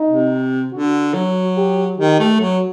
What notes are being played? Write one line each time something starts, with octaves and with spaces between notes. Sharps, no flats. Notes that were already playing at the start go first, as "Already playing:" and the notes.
Already playing: D#4
C3
D3 F#4
F#3 F#4
G4
D#3 G4
A3
F#3 F#4